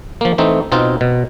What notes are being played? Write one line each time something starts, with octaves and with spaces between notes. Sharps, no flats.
F3 A#3
E3 A3 C4 D#4
B2 C4 D#4 F4
B2